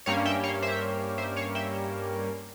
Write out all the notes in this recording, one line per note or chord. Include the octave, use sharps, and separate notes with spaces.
G2 G3 A#3 C#4 C#5 F5
E5 G5
C#5 F5
C5 E5
C5 E5
C#5 F5
E5 G5